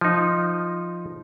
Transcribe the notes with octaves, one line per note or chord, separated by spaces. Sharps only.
F3 D#4